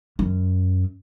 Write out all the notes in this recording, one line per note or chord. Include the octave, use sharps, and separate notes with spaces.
F#2